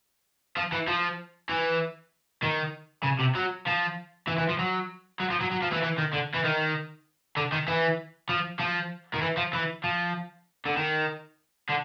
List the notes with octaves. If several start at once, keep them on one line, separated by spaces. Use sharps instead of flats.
F3
E3
F3
E3
D#3
C#3
C3
F#3
F3
E3
E3
F3
F#3
F#3
F3
F#3
F#3
F3
E3
E3
D#3
D3
E3
D#3
D3
D#3
E3
F3
F3
D#3
E3
F3
E3
F3
D3
D#3
D3